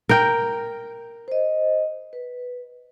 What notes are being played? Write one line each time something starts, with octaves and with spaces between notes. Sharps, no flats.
A#4 G5
C5 D#5
B4